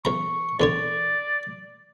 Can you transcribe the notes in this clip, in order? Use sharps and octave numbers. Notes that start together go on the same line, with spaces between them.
E2 A#5 C#6
E2 D3 C#5 D5